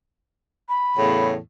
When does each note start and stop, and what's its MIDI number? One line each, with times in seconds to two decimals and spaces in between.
0.69 1.27 83
0.97 1.36 40
0.97 1.36 45
0.97 1.36 49